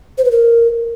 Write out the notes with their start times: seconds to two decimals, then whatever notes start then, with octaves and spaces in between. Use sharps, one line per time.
0.18 C5
0.25 B4
0.31 A#4